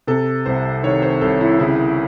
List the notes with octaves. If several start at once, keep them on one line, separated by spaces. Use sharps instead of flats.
C3 A4
C2 C5
D#3 C#5
C5
C2 A4
E4
C#3 E4